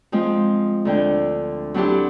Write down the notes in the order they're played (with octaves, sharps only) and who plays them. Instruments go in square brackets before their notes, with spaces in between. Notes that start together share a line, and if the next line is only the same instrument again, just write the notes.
[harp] F3 G#3 C4
D2 D3 G5
F#3 C4 D4 E4 G4